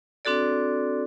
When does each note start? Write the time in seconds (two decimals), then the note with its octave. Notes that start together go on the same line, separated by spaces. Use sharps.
0.25 C4 D4 F#4 A4 D5